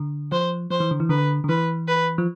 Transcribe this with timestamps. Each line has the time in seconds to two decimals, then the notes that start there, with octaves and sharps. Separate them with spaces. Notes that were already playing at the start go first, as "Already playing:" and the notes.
Already playing: D3
0.32 F3 C5
0.70 F3 C5
0.80 E3
0.91 D3
1.00 E3
1.09 D3 B4
1.44 D3
1.49 E3 B4
1.88 B4
2.18 F3